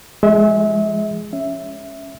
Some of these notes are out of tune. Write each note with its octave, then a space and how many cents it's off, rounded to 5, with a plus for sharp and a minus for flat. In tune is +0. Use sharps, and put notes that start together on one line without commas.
F3 -25 G#3 +0 E5 -30
C#4 +0 E5 +0